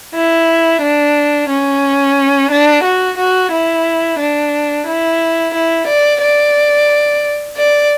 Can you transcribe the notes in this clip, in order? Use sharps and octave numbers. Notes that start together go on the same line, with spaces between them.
E4
D4
C#4
D4
F#4
F#4
E4
D4
E4
E4
D5
D5
D5